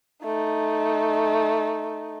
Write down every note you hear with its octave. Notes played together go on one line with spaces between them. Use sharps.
A3 D#4